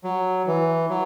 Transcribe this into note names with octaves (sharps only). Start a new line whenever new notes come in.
F#3
E3
F#3